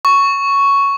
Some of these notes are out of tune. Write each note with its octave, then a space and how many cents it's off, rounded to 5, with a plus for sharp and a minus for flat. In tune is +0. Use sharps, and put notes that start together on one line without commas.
C#6 +5